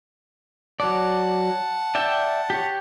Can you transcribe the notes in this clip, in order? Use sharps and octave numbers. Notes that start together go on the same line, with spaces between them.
F#3 D5 F#5 A5
D5 E5 G5
G4 C#5